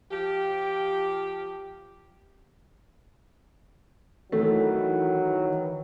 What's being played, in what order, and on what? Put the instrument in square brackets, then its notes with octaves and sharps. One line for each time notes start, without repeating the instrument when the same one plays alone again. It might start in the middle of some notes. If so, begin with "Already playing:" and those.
[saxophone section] F3 G4
[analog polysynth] D#3 E3 [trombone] F#3 [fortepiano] A3